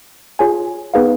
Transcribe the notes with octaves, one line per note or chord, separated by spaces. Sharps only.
F4 G#4 C#5 G#5
B3 D#4 G#4 B4 F5